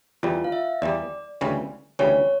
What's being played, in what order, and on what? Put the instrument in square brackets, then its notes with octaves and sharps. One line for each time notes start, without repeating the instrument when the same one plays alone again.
[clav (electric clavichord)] E2 E3 G3 [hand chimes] F4
[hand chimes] F5
E5
[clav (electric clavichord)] E2 E3 G3 [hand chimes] D5
[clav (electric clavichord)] D2 C#3 E3 G3 C#4
[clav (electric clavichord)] D2 C#3 E3 G3 C#4 [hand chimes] C#5